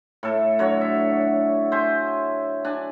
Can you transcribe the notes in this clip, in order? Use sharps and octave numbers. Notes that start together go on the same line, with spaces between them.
A2 A4
D3 F#3 F#4 C#5
E5
C5 E5 G#5
D4 G#5